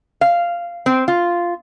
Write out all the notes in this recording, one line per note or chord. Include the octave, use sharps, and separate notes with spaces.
F5
C4
F4